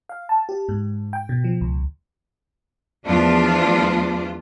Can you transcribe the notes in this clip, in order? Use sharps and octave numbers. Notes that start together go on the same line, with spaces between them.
F5
A5
G4
G#2
G5
B2
F3
C#2
E2 F3 A3 D4 F4